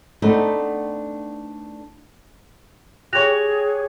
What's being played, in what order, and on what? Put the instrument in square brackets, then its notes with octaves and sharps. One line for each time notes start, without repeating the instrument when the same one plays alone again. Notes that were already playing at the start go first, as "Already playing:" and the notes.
[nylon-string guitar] A3 B3 C4 D4 D#4
[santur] G4 C#5 C#6 [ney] G#4 [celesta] F#6 A#6 F7